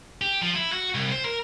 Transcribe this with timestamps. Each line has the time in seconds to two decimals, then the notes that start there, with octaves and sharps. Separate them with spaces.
0.21 G4
0.41 F3
0.56 E4
0.72 F#4
0.95 C2
1.12 C5
1.25 A#4